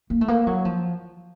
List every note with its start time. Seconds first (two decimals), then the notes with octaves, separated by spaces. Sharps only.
0.10 A#3
0.21 A3
0.28 A#3
0.47 F#3
0.65 F3